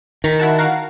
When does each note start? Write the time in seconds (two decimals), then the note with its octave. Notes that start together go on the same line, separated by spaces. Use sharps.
0.24 D#3 A#5 B6
0.39 E4 F#4 A5
0.58 F#4 A#4 F5